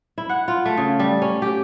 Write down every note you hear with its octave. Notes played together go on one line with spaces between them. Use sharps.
E4
F#5
F4
A3
C#3
G3
C#4
G4